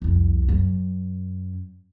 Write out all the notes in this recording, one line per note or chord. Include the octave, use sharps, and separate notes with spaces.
C2 F2
F#2